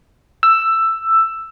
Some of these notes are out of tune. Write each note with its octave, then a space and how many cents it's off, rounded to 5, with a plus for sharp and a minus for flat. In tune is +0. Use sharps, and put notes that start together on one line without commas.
E6 +10